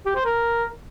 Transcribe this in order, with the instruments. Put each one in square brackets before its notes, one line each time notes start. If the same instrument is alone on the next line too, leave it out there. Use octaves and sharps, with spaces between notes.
[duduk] G4
C5
A#4